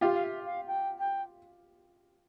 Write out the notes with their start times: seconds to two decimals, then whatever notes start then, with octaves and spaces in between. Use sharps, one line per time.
0.01 F4 G4 F5
0.13 F5
0.24 E5
0.45 F5
0.66 G5
0.98 G5